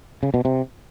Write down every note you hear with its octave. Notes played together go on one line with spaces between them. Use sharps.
C#3
B2
C3